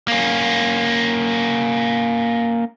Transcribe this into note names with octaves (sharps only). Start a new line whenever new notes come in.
A#3 C#4